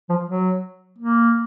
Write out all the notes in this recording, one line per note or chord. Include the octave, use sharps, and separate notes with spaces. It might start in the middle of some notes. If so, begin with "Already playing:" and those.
F3
F#3
A#3